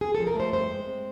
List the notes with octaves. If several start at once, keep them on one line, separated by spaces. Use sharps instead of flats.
E2 G#4
A4
F3
A#4
A3 C5
G2 C5
G#3
C4